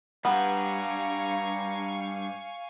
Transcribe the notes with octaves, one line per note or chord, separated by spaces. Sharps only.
G2 G3 B3 F5 G#5 A#5 C#6